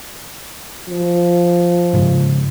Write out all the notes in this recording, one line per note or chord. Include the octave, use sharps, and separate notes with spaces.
F3
G#2 C#3 G#3